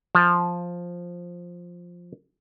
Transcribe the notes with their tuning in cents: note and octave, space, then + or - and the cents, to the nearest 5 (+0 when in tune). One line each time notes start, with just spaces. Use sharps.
F3 +5